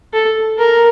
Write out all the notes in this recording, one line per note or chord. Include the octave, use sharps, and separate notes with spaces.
A4
A#4